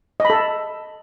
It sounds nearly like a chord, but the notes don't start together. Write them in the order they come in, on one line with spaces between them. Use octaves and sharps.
D#5 B5 A4